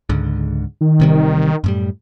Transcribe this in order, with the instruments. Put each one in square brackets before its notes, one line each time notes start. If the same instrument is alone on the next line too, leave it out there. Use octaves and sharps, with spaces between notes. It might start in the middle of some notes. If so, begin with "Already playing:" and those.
[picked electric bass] C#2 G#2 D3
[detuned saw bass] D#3
[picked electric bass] A1 C3 G3
F#2 A2 G3